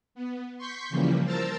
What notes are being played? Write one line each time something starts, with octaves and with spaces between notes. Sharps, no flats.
B3
C6 C#6 G6 B6
C#3 E3 F3 G3 A#3
A#4 C5 A5 A#5 E6 A6